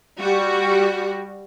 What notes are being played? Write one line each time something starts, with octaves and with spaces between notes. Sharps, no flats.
G3 F#4